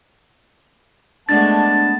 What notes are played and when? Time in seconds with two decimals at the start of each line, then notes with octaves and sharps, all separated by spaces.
1.29 G#3 A3 B3 D4 A5 A6